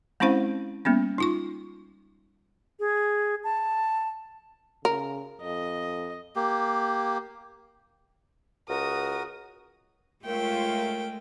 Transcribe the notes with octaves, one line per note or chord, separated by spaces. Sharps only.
G#3 C4 C#4 E4 C5 F5
G3 A#3 B3 C#4
D#4 F4 C#6
G#4
A5
C#3 A#4
F2 D#5
A#3 G4
C#2 F#4 A#4 D#6
G#3 A3 F4 A#4 C#5 E5 G5